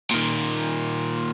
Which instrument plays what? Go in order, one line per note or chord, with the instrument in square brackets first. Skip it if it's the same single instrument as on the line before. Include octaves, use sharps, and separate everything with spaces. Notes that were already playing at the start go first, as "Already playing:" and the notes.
[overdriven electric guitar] A#2 D#3